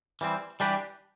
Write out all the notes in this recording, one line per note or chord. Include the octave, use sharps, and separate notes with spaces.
E3 G3 C4
E3 G3 D4 G4 B4